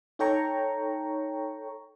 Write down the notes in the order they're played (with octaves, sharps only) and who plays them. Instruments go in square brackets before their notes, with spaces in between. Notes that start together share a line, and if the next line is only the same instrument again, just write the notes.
[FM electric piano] D#4 A4 C#5 G5 A#5 C#6